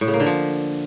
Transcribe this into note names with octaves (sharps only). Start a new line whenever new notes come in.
A2
C#3
A#3
D3
F3